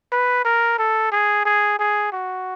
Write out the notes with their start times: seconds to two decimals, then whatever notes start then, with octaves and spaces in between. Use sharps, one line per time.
0.12 B4
0.45 A#4
0.79 A4
1.12 G#4
1.45 G#4
1.79 G#4
2.13 F#4